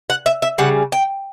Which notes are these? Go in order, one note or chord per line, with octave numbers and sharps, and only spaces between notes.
F#5
E5
E5
C#3 G3 F#5
G5